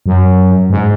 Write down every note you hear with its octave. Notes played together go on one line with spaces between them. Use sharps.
F#2
G#2